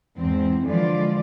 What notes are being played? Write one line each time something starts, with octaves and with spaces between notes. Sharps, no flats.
E2 G#2 C4
D3 E3 F3 G#3 F4 D5